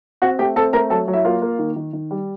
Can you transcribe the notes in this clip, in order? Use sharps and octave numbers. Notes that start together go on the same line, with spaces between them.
C4 F#4 F#5
A3 G4 G5
C4 A4 A5
A3 A#4 A#5
F#3 A4 A5
F#3
E4 E5
A#3 F4 F5
A#3
D#3
D#3
D#3
G3